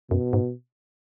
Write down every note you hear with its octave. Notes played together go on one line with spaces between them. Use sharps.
F#2 B2
G#2